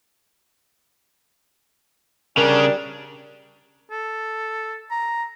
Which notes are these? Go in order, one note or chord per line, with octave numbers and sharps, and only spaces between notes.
C#3 G3 C#4 D4 A#4
A4
A#5